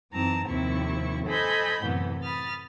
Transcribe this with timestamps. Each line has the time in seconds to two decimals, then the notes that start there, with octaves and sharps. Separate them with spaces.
0.12 F#2 E3 C4 D#4 A5 A#5
0.46 D#2 C3 F3 C4 E4 C#6
1.26 A4 C5 D#5 G#5 B5 G6
1.82 F#2 A2 C3 E3 B3
2.23 B5 D#6 F6 A6